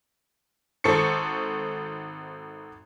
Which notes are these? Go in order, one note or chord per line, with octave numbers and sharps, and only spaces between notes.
G#1 A4 C5 C#6 C#7